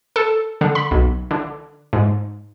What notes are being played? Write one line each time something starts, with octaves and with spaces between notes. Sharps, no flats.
A4
D3
B5
B1
D3
G#2